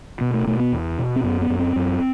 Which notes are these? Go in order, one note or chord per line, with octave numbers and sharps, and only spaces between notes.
B2 B3
A3
B2 A3
B3
E2
B2
C4
F#2 B3
B3
F#2
C4
F#2